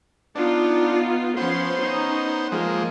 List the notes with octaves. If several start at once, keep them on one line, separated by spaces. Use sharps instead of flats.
B3 D4 D#4 F4
F3 B3 C#4 C5 C6
C#4 D#4
F3 G#3 A#3